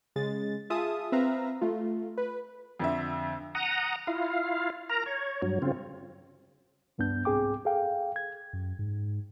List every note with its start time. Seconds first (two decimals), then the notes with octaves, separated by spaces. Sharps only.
0.16 C#3 G#3 A6
0.70 F4 G#4 E5 A5 D#6
1.12 C4 B4 E5 F5 A#5
1.61 A3 F4
2.18 B4
2.80 F2 D3 E5
3.55 F#5 A#5 D#6
4.07 E4 F4 F5
4.90 A#4 A#5
5.06 C#5
5.42 G2 F#3
5.62 C#3 C4 F4
6.98 C#2 G2 B3 D4 G6
7.25 C2 G#2 C4 G#4 G5 D6
7.65 G#4 A4 F5 G5
8.16 G#6
8.53 F#2
8.79 G#2